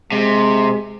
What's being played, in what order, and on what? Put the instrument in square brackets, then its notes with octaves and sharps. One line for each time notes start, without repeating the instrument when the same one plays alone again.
[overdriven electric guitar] C3 [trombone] G#3